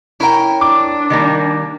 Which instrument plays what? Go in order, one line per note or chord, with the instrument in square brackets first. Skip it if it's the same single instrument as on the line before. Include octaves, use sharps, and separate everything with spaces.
[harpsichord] C#4 A#4 [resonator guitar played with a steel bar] E4 G5
[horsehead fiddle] D4 [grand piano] D6
[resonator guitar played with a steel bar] D#3 G3 A#3